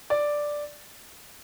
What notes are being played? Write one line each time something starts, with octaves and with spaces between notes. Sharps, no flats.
D5